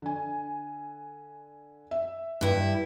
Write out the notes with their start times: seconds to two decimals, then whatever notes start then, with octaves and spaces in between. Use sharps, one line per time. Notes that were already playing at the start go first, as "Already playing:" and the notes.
0.02 D3 G#5
1.91 E5
2.41 G2 E4